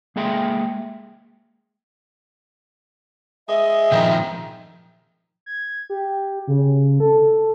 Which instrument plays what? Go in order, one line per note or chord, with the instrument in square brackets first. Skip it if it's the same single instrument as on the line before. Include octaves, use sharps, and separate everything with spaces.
[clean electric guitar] G#3 A#3 G#4 E5 G5 C6
[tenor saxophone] G#3 [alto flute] E5 [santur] D#6
[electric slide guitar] A#2 D#3 F3 [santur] D#4 D#5 G5
[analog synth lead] G#6
G4
C#3
A4